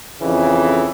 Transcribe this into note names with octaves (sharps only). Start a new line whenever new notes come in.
F2 C#3 E3